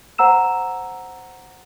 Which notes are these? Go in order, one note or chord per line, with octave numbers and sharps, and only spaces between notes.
C5 F#5 A#5 E6 E7